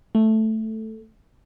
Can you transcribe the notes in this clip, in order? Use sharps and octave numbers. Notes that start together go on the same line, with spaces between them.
A3